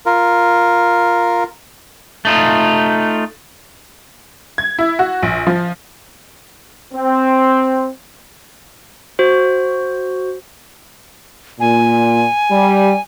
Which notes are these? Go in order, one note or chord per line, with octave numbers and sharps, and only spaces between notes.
F4 A#4
A3 D#4 F4
G#6
E4
F#4
A#1
F3
C4
F#4 C5
A#2 G#5
G3